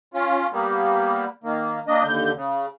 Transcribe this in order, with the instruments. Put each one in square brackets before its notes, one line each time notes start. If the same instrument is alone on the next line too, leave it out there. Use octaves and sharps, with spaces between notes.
[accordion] C#4 F4
G3 A#3 B3
D#3 A#3
A#3 D4 D#5
D#2 D3 G6
C#3